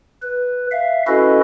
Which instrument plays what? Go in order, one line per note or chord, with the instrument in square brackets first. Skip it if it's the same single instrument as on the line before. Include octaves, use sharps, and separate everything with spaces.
[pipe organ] B4
E5 F5
C#4 E4 F#4 A4 B4 D#5